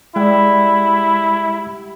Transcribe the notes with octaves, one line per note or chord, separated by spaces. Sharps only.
G3 G#3 E4 G4 F#5